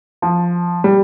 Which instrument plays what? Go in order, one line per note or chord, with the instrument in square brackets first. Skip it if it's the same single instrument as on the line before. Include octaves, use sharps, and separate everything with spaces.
[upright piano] F3
G3